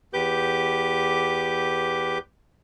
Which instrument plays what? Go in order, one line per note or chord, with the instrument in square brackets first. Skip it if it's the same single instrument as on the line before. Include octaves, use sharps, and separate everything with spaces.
[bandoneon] E2 G4 B4 D6 G6